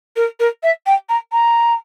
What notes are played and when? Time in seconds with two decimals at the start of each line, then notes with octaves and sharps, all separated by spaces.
0.16 A#4
0.40 A#4
0.63 E5
0.86 G5
1.09 A#5
1.32 A#5